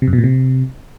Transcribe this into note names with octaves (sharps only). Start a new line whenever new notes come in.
C3
F#2
B2
A#2
C3